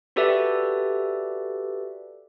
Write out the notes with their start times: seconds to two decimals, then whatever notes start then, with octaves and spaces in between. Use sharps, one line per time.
0.16 F#4 G4 A4 B4 D5 E5